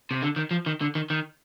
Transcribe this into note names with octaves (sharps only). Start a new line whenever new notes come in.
C3
D3
D#3
F3
D#3
D3
D#3
D#3